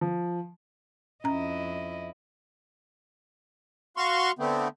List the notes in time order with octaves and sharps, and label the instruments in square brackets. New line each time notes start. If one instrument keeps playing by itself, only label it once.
[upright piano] F3
[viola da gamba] F2 E4 D#5 [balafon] C#4 A#5
[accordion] F#4 F5 C6 C#6
D3 A3 B3 C4